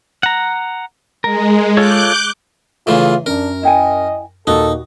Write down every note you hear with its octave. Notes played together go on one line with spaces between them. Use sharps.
F#5 A#5
G#3 A#4
F4 A4 C#5 D6 F#6 G6
C#3 E3 A3 F4 E5
F#2 D4 A#4
E4 D#5 G5 G#5
D#2 A#2 D#3 D#4 F#4 A4